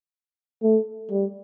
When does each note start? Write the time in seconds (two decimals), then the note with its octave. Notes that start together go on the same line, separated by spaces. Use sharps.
0.63 A3
1.11 G3